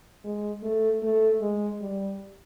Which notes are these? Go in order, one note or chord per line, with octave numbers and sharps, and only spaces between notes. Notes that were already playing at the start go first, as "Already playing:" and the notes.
G#3
A3
A3
G#3
G3